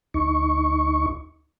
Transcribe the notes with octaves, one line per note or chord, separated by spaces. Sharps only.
D2 D#4 C#6